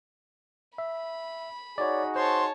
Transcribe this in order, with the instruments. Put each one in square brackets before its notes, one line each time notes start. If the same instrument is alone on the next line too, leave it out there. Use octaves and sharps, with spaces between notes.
[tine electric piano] E5 [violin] B5
[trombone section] D#4 F#4 G#4 [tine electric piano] C#5 D5
[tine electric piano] C5 [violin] C#5 A5 [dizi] C6